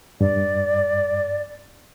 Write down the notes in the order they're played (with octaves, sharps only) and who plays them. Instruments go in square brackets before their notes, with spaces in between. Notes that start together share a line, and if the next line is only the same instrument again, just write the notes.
[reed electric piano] G2 [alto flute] D5